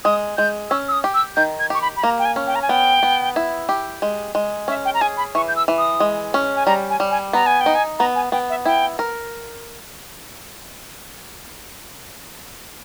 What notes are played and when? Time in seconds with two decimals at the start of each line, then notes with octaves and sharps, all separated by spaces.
0.05 G#3 D#6
0.37 G#3 G6
0.70 C#4 E6
0.88 E6
0.92 D#6
1.04 G4
1.14 E6
1.36 D#3 G6
1.59 G#6
1.70 G4 C#6
1.82 B5
1.97 B5
2.03 A#3 A#5
2.19 G5
2.25 G#5
2.36 C#4
2.47 G5
2.55 A#5
2.62 G#5
2.69 B3 G5
3.03 B3
3.36 E4
3.69 G4
4.02 G#3
4.35 G#3
4.68 C#4 E5
4.85 G5
4.94 A#5
5.01 G#4 G#5
5.17 B5
5.35 E3 C#6
5.48 G6
5.56 E6
5.68 E3
5.78 D#6
6.00 G#3
6.34 C#4
6.56 G#5
6.66 G3 A#5
6.90 G#5
7.00 G3
7.11 G#5
7.33 B3 A#5
7.46 G#5
7.61 G5
7.66 D#4
7.75 G#5
7.99 B3 A#5
8.15 G#5
8.32 B3 G5
8.50 E5
8.65 E4 G5
8.99 A#4